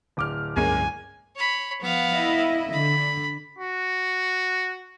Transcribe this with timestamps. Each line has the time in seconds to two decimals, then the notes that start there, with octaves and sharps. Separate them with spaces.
0.17 D1 D6 F6
0.56 C#2 G2 F#3 G#3 A#3 C#4 G#5
1.35 C#5 B5
1.81 F3 B3 F5
2.13 E4 D#5 E5
2.72 D3 B5
3.59 F#4